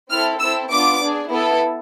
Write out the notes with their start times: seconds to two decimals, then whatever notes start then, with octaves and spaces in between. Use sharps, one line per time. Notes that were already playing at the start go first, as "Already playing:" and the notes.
0.10 C4 E4 A4 F6
0.40 C4 E4 A4 E6
0.70 B3 D4 F4 D6
1.00 D4 G#4
1.31 B3 E4 A4